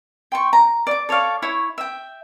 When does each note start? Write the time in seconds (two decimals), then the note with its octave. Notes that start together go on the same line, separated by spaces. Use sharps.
0.32 G5 C6 C#6
0.53 A#5
0.87 D5 D6
1.09 A4 C#5 D5 F5
1.42 E4 C#5 C#6
1.78 E5 G5